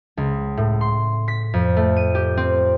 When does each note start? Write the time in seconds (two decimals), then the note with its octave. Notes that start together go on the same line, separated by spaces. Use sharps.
0.17 C#2
0.57 A2
0.81 C6
1.28 B6
1.54 F2
1.77 A3
1.97 D#7
2.15 G4
2.37 C4